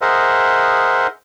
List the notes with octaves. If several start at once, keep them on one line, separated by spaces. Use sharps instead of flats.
G#4 A#4 C5 D#5 E5 F#5